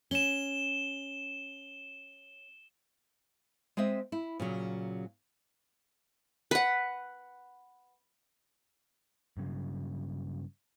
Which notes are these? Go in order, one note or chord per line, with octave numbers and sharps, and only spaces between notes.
C#4 E7 G7
G#3 C4 D#5 E5
E4
A#2 C#3 F#3
B4 F#5
G2 C#3 F#3